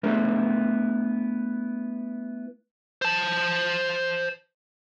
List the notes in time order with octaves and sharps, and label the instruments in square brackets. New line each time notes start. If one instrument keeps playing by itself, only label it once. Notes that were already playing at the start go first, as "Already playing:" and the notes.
[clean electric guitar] A3 B3 D4 E4 G#4 A#4
[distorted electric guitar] C5 A5